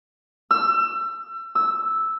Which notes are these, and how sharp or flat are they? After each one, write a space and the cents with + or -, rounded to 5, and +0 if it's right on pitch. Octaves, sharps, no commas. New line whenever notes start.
E6 +30
E6 -5